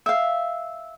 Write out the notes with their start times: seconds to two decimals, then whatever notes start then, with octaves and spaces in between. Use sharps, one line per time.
0.06 E5 F5